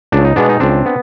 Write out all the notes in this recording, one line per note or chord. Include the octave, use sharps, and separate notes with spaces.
C#2 D4
D#4
B2 G#3 B3 D4
D#4
C#2 C4 D4
B3